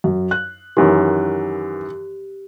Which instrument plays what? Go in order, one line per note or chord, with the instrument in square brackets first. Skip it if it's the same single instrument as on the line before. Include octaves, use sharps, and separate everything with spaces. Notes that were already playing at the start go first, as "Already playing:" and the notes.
[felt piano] F#2
F#6
[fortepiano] F#2 D#3 E3 [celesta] G4